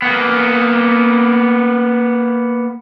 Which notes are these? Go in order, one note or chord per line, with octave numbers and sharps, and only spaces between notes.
A#3 B3